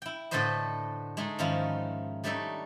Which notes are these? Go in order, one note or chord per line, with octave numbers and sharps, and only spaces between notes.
E4 G5
A2 D3 A4 B4 C5 D#5
G#3 A3 D#4
G#2 D#3 F3 C#4 D#4 E4
G3 A3 D4 D#4 A4 C#5